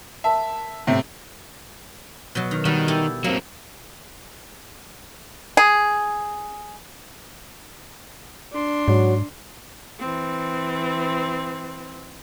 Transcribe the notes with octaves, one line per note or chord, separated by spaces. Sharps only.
A#4 E5 A5 C6
A2 C3
B2 F#3
D#3
D#3 G3 F#4
E4 G4 A4
F#3 A#3 C4
G#4
D4 C6
G#2 F#3
E3 C4